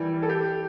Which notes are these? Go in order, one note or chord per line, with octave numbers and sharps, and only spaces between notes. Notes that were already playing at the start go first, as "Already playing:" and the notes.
Already playing: E3 G3
A4
G4